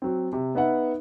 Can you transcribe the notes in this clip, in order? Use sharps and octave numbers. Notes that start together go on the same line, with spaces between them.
F#3 C4
C3
B3 D#4 B4 E5 F#5